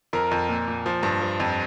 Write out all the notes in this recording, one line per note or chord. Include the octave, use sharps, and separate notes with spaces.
F2 A#4
F2
A#2
A#2
F3
G2
F3
F2